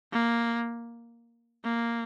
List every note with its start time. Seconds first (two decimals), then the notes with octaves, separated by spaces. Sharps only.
0.12 A#3
1.64 A#3